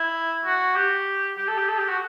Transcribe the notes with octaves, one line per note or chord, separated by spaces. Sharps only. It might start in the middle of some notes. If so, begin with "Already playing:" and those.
Already playing: E4
F#4
G4
G4
A4
G4
A4
G4
F#4